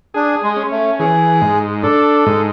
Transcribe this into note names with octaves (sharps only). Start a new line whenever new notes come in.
D4 G#4
G#3
C#4
A3
E3 G#4
G#2
D4 A4
G#2